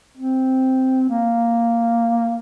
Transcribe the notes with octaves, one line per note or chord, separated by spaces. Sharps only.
C4
A#3